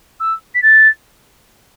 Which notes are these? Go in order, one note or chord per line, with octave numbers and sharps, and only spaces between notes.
E6
B6
A6